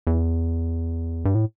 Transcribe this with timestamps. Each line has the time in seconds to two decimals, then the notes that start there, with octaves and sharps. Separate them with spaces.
0.07 E2
1.25 G2
1.35 A2